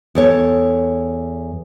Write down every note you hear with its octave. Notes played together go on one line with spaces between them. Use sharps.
E2 A4 C#5